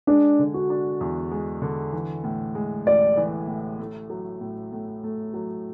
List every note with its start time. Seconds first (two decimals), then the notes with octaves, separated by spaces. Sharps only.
0.07 G#3 D4
0.39 D3
0.54 F#4
0.70 D4
1.01 E2
1.31 G#3
1.62 D3
1.93 E3
2.24 A2
2.55 G#3
2.86 A1 D5
3.17 E3
3.48 A2
3.80 A3
4.10 F#3
4.41 A2
4.72 A2
5.04 A3
5.34 F#3